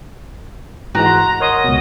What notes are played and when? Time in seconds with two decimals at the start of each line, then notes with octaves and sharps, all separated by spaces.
0.95 G#2 E3 G#3 F#4 F#5 A#5
1.06 C6
1.40 A#4 C#5 D#5 C6
1.64 C#2 B2